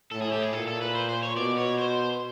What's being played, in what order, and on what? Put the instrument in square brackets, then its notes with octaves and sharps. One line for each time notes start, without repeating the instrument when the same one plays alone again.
[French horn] A2 [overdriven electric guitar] A4
[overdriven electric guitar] G#4
G4
G#4
[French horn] A#2 [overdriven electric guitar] A4
[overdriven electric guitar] A4
B4
C5
C5
C#5
[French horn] B2 [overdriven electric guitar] D5
[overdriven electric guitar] C#5
C5